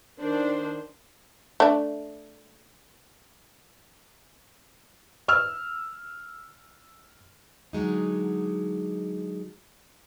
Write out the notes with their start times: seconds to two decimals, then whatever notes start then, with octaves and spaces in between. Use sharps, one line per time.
0.20 D#3 D4 C5
1.60 A3 D4
5.28 E6 F6
7.73 D3 F#3 G#3 D#4